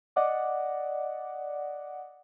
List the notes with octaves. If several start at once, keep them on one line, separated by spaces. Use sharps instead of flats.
D5 D#5 F#5 D6